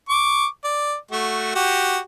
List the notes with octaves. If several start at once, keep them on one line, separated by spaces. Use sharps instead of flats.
C#6 D6
D5
A3 F#4
F#4 G4